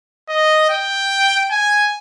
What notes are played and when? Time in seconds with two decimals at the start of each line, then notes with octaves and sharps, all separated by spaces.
0.29 D#5
0.70 G5
1.51 G#5